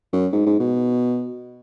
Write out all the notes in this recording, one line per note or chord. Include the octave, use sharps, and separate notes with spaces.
F#2
G#2
G#2
B2